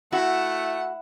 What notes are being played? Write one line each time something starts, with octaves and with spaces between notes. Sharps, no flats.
A3 E4 F#4 F#5